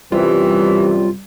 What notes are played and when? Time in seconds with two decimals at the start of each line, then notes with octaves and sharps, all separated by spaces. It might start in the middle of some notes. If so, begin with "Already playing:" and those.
0.12 F#2 C3 E3 G3 F4